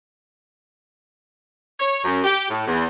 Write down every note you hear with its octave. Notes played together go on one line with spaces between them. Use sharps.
C#5
F#2
G4
A2
E2